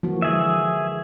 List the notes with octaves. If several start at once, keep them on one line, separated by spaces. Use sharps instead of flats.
E3 F3 A#3 F#4
D3 G#3 G#4 E5